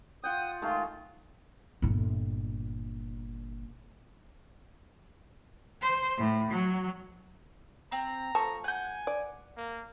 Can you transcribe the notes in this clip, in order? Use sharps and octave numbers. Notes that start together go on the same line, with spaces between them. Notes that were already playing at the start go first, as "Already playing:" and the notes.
F4 F#5 G5 D#6
D#3 G#3 A3 F4
G1 A#2
C5
A2
F#3
C4 A#5
F3 A3 A5 C#6
F#5 G#5 G6
D5
A#3